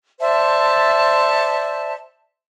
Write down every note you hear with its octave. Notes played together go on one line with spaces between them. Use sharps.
C5 D5 E5 A5